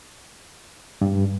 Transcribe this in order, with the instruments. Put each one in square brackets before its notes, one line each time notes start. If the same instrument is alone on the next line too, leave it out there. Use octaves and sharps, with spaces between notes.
[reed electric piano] G2